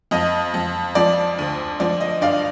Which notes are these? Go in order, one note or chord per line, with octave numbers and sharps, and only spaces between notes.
F2 D#5
F2
F3 D5
D2
F3 D5
D#5
G2 D5 F5